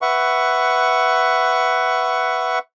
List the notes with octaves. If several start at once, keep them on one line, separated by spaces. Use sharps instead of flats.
B4 E5 F#5 C#6